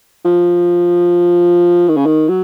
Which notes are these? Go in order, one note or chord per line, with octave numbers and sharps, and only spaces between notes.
F3
D#3
C#3
D#3
F#3